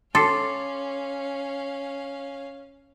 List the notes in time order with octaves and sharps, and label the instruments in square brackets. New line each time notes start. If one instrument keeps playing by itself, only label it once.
[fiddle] C#4 F5 [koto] A4 [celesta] C6 D6 C7